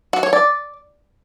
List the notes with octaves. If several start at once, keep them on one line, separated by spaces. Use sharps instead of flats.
F#4
C#5
D5